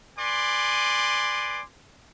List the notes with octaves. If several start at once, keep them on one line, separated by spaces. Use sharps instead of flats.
B4 D5 G#5 C6 D6